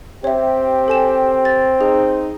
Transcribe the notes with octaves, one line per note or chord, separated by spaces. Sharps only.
C4 G4 C#5 E5
A4 G#5 E7
A6
D#4 G#4